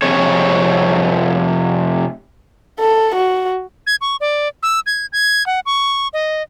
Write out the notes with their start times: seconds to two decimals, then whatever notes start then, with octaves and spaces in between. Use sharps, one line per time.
0.02 F2 C3 G#4 C#5
2.80 A4
3.15 F#4
3.87 G#6
4.01 C#6
4.21 D5
4.63 E6
4.86 G#6
5.13 G#6
5.46 F#5
5.66 C#6
6.13 D#5